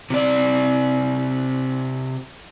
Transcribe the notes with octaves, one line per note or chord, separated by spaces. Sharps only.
C3 D5